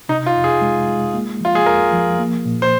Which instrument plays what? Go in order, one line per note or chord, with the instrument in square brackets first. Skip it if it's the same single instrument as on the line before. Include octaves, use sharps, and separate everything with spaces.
[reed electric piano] C3 [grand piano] D#4
[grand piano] F4
[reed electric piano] F2
[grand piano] G#4
[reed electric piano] G#3
G#3
A#3
[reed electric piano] F3 [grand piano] F4
[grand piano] G#4
[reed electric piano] F2 [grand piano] A#4
[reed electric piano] F3
A#3
A#2
[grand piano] C5